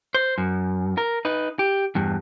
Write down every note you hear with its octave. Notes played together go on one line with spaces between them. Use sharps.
C5
F#2
A#4
D#4 B4
G4
E2 G2